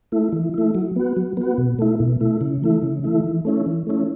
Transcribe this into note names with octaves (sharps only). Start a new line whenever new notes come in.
A3 E4
E3
A3 E4
F#3
B3 F#4
F#3
B3 F#4
B2
A3 E4
B2
A3 E4
C#3
E3 A3 E4
C#3
E3 A3 E4
E3
A3 C#4 E4
E3
A3 C#4 E4